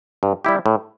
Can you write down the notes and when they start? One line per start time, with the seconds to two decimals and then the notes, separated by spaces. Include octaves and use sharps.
0.23 G2
0.45 G3 E4 G4
0.66 A2